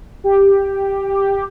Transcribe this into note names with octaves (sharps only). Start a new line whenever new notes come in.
G4